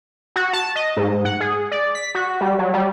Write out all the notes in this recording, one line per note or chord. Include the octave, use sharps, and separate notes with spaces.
F#4
A5
D#5
G#2
F#5
G#4
D5
B6
F#4
G3
F#3
G3